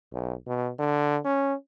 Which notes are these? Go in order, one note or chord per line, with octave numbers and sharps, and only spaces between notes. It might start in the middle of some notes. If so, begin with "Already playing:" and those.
B1
B2
D3
C#4